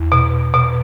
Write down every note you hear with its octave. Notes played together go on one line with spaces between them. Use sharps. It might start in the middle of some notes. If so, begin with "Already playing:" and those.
Already playing: E2
B2
B2